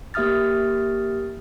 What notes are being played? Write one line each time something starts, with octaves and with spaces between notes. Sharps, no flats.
A#3 G4 E5 D#6 F6 A6